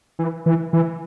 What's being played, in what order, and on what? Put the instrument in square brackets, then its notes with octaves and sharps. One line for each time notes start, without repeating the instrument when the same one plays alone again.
[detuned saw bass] E3
E3
E3